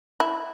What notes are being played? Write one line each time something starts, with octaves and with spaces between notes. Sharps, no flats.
E4